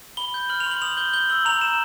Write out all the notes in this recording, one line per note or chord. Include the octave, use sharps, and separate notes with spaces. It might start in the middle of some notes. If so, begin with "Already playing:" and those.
B5 G7
G6
F6 F#7
F7
C6
F#7
D#6 F7
G6 G7
G6 G7
E6 F#7
A#5 F7
A#5 E7